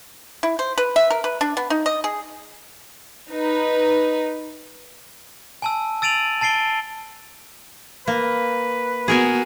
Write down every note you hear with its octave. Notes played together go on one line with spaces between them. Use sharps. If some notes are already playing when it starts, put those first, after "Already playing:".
E4
C5
B4
E5
A#4
B4
D4
B3
D#4
D#5
G#4
D#4 B4
G#5 A5 E6
E6 A6 D7 D#7 F7 F#7
A5 A6 C7 D7 G7
A#3 B4
B3 F#4 G#4 A#4 G#5